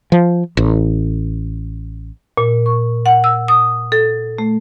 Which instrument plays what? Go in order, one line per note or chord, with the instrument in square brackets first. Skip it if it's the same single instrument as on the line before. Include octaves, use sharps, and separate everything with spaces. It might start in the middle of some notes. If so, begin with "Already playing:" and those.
[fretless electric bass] F3
A1
[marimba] A#2
C#6
F#5
E6
D#6
A4
A3